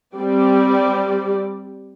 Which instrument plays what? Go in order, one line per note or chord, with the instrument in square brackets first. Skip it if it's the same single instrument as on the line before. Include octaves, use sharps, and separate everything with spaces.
[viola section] G3 C4 D5